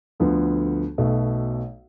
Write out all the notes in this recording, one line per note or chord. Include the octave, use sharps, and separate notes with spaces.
D2 D3 F3 B3
B1 B2 A3